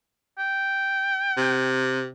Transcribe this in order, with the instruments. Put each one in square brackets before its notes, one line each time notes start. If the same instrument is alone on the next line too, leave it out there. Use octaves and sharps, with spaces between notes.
[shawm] G5
[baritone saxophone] C3